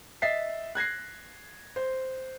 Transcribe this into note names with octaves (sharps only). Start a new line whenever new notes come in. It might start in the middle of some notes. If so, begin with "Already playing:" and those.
D#5 E5 A6 B6 C7
F#6 G#6 A#6 C7
C5